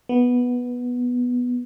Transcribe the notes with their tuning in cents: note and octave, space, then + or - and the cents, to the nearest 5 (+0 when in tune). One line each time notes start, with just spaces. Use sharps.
B3 -5